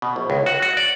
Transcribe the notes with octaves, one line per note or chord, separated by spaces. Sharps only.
B2
A#1
C#2
F#4
F#4
D5